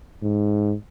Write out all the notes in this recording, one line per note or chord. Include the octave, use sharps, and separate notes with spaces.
G#2